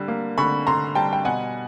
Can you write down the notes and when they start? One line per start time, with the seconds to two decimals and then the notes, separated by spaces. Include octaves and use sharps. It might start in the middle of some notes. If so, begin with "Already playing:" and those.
Already playing: D3 G3
0.08 A#3
0.38 D3 B5 C#6
0.67 D3 A#5 C6
0.95 G3 G5 A5
1.13 G5
1.25 B2 F#5 G#5